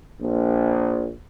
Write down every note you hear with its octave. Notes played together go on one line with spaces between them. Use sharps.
A#1